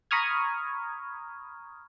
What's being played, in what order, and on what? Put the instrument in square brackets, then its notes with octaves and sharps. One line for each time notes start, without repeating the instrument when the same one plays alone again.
[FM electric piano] A#5 B5 C#6 D#6 F6 G#6